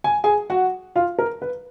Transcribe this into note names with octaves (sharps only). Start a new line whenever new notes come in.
G#5
G#4 G#5
F#4 F#5
F4 F5
A#4
B4